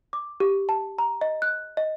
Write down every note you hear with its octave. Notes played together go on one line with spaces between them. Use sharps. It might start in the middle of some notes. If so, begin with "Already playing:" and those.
D6
G4
A5
A#5
D#5
F#6
D#5